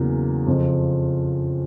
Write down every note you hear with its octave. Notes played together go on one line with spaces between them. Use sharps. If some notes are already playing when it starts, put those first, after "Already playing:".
Already playing: E2 C#3 F#3 A#3
F2 C#3 F3